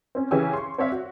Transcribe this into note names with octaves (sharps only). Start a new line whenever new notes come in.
C4 C#4
C#3 E3 C#4 G4 G#5 E6
C6 C#6
C4 C#5 D5 E5 F5
F#4